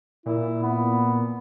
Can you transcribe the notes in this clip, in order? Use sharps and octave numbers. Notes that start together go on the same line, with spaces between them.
A#2 E4
B3